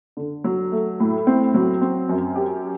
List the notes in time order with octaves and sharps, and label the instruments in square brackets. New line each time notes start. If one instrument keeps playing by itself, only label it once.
[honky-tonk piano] D3
F#3
A3
A2
C4
F#3
C4
F#2
G4